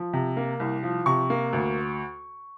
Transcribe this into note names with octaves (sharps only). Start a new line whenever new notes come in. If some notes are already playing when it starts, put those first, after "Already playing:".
Already playing: F3
C3
A#3
C2
F3
C3 C#6
A#3
D2